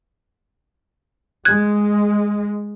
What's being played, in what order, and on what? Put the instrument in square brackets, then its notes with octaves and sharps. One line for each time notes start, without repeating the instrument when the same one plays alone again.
[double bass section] G#3 [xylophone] F#6 G#6